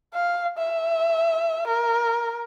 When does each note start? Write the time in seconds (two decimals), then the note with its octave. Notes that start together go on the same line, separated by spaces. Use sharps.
0.15 F5
0.58 E5
1.67 A#4